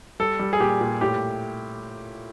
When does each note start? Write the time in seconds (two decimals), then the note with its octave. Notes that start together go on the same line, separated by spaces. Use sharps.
0.20 G3 A4
0.39 G3
0.53 G#4
0.60 A#2 G4
0.81 A#2
1.01 A2 G4